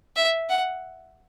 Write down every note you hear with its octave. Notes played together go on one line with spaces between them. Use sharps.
E5
F#5